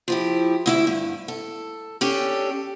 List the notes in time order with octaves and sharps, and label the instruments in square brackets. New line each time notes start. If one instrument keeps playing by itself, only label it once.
[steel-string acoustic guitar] F3 E4 G4
D2 E4 E5
G2
A4
C#4 D4 G4 A4